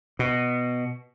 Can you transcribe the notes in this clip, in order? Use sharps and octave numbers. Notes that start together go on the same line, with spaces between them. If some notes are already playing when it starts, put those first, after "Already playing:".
B2